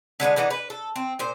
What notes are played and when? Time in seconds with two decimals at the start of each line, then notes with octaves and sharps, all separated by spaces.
0.20 D3 G#3 A#3 B3
0.36 D3 E3 B3 D#4
0.50 B4
0.70 A4
0.96 C4
1.19 A#2 C5